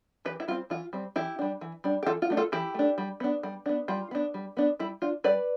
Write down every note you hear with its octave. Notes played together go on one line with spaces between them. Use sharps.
E3 G4 B4
E4
G3 C4 F4
E3 F4
G3 C4
E3 E4 G4
G3 D4
E3
G3 D4
G4
E3 F4 A4
F4
A3 D4
F4 A4
E3 E4 G4
A3 D4
G3
B3 D4
G3
B3 D4
G3 F4
B3 D4
G3
B3 D4
G3 E4
D4 F4
G3 B4 D5